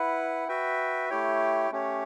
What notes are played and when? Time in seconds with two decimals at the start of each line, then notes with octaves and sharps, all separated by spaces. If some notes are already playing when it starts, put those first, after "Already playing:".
Already playing: E4 B4 F#5
0.48 F#4 B4 E5 G5
1.10 A3 E4 G4 C#5 G5
1.71 A3 C#4 G4 C#5